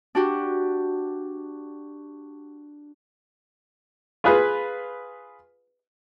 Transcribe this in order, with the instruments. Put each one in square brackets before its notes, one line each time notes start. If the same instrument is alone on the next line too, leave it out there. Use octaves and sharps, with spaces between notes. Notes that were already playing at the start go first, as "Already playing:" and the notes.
[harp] D4 F#4 G4
[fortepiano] F4 G#4 B4